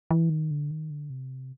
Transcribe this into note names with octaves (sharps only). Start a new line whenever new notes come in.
E3
D#3
D3
D#3
D3
C3